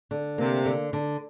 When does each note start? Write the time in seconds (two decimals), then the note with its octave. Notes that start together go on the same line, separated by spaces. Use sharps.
0.11 D3
0.38 C3 A#3
0.66 D3
0.93 D3